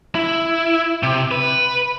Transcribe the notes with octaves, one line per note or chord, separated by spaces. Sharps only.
E4
C3
B4